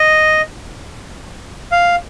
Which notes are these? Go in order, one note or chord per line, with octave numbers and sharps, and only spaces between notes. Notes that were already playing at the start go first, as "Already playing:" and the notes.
Already playing: D#5
F5